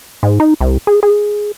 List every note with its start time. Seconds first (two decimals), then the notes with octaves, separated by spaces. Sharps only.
0.23 G#2
0.40 D#4
0.61 C2
0.87 G#4
1.03 G#4